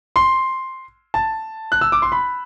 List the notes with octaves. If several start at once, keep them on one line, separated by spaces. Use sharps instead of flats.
C6
A5
F#6
E6
D6
C6
B5